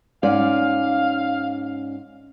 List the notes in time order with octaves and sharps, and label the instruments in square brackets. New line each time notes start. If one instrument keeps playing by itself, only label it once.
[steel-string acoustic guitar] G#2 C#4 D5 [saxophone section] F5